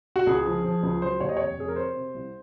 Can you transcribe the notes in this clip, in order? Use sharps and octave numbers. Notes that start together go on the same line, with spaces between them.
F#4
C#2 G#4
F3
F3
C#2
F#3 C5
D#2 C#5
D#5
F1 C#5
F1 G#4
A#4
C3 C5
C3
C2